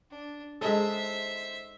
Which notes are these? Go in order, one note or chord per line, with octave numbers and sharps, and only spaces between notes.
D4
G#3 D#4 A4 C5 E5